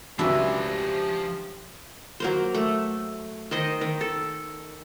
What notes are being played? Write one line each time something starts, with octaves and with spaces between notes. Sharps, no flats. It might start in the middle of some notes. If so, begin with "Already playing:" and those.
C#2 F3 F#3 D4 E4 F#4 G4 G#5
F#3 A#3 C5
A3
D#3 C5 D#5
D#3
A4